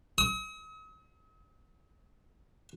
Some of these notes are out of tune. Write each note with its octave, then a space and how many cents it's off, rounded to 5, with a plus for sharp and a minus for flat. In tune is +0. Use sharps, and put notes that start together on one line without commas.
D#6 +45